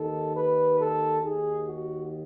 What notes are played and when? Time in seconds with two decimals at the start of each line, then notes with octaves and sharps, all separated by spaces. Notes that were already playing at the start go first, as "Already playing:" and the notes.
Already playing: D#2 D#3 A4
0.34 B4
0.78 A4
1.22 D#2 D#3 G#4
1.66 F#4